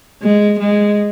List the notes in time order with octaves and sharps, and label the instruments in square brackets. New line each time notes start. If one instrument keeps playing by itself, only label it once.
[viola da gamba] G#3
G#3